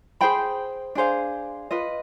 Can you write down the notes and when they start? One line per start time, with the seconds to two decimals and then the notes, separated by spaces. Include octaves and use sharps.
0.21 G#4 C5 G5 B5
0.95 D4 G#4 C5 F5
1.71 F4 B4 D#5